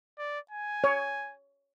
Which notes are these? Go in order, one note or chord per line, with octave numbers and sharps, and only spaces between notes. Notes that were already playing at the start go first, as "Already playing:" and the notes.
D5
G#5
C#5